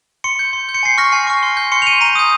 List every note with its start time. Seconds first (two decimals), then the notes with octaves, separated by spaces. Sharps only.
0.24 C6 C#7
0.39 G6
0.53 C6
0.69 G6
0.75 C#7
0.83 G#5 C7
0.97 C#6 F6 A#6
1.12 G#5 C7
1.27 C#6 F6
1.43 C6
1.57 G6
1.72 C6 C#7
1.82 F7
1.86 G6 D#7
2.01 A#5 D#7
2.15 D#6 G6